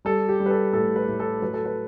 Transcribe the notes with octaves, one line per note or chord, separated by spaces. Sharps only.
G3 A4
G4
G3
B4
A4
A2 A4
B4
A2
A4
F#3 B4
A4
B4